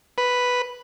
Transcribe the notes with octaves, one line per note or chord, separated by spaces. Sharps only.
B4